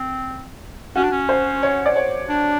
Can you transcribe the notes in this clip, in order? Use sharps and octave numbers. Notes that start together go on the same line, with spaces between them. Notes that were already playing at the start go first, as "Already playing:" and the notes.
Already playing: C4
C#4 F#4
D4
C#4
C5
C#5
D5
C#5
D4